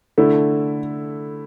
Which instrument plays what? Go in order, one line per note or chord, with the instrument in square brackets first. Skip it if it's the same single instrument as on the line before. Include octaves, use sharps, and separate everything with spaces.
[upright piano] D3 A3 E4